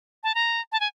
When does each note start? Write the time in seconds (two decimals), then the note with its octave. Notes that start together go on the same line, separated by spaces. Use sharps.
0.24 A5
0.35 A#5
0.72 A5
0.80 G#5